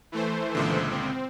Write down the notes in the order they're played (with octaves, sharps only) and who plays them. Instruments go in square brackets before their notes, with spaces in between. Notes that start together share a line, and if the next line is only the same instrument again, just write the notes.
[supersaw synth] E3 A3 C5
[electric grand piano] C#2 A#2 D3
[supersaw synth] C4